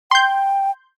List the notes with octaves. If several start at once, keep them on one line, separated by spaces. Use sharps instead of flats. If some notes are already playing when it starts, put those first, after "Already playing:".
G5 C6 G6